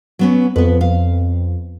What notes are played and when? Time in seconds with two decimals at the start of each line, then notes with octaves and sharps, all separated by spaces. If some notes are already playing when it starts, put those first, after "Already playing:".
0.19 F#3 B3 C#4
0.56 F2 B3 B4
0.81 F5